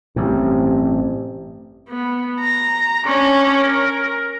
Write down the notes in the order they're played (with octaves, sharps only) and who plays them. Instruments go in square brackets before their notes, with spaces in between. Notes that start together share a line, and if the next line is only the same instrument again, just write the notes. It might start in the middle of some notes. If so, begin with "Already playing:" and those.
[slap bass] A1 G2 [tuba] C3
[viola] B3
A#5
C#4 D4
A#4